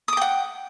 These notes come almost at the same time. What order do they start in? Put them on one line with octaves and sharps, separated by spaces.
D#6 D6 G5 F#5